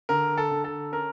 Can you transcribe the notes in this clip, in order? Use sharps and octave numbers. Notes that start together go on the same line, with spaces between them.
D3 A#4
A4
D3
A4
C#4 A#4